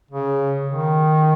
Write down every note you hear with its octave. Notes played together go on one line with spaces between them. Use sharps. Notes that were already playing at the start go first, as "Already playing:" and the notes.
C#3
D#3